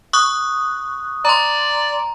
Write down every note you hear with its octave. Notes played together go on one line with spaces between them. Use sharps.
C#6 D#6 F#6
D5 A#5 C6